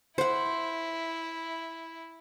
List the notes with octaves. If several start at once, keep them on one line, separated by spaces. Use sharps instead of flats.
E4 C5 F#5